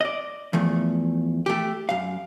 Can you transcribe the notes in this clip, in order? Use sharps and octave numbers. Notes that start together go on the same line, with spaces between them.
D5 D#5
E2 F3 A3
A3 G4
F#2 F5